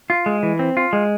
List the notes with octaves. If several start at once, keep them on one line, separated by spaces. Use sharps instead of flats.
F4
G#3
E3
C4
F4
G#3